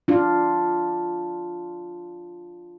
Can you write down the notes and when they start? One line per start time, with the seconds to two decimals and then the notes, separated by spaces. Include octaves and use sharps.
0.08 D4 F4